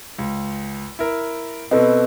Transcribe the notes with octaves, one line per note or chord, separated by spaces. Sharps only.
C#2
E4 A#4
B2 C4 A4 B4 D#5